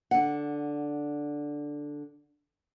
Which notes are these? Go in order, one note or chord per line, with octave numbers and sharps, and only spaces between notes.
D3 F#5